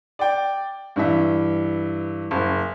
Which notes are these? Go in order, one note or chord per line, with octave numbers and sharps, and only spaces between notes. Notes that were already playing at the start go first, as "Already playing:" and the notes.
D5 G5
G2 E3 E5
F#1